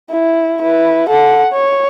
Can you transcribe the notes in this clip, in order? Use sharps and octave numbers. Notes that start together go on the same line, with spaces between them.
E4
E4 B4
A4 F#5
C#5